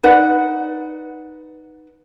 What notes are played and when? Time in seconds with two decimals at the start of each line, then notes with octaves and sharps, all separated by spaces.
0.03 D#4 B4 D5 F#5